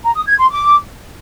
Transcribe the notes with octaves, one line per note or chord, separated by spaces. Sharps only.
A#5
D#6
G#6
C6
D6